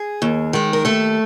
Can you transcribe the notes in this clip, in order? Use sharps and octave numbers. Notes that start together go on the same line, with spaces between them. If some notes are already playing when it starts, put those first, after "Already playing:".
Already playing: G#4
D#2
D#3 G#3
A#4
D#2 A3 A4